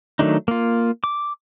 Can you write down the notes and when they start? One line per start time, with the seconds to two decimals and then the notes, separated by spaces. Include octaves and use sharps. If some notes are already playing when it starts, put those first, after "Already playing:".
0.19 D#3 F#3 A3 D4 D#4
0.48 A#3 F4
1.04 D6